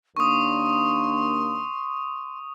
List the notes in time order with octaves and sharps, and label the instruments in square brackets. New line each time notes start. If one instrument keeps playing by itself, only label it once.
[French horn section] D#2 A#3 D4 [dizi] C6 [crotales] C#6 D#6